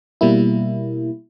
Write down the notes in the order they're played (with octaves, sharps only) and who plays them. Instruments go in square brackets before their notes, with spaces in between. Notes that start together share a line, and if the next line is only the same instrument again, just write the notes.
[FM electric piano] B2 G3 A#3 E4